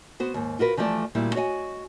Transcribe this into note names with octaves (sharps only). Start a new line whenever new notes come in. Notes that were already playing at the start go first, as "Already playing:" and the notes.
B3 F#4 C5
D#2 G#2
F4 F#4 A#4 B4
E3 F3 G3 A3 D5
D2 A#2 G3 A#3 E4
F#4 C#5 D#5 F#5 G#5